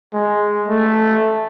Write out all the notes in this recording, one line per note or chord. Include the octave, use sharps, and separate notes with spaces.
G#3
A3